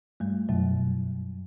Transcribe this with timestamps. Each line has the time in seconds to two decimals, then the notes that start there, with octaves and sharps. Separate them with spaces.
0.20 G2 G3 A3
0.49 F#2 B2 F#3